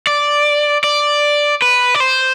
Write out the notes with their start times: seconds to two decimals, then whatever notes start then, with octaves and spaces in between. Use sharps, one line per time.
0.07 D5
0.84 D5
1.62 B4
1.95 D5
2.00 C5